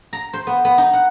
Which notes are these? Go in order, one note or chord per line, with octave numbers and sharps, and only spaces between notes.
A#5
C5
B3
B3
D#4
F#5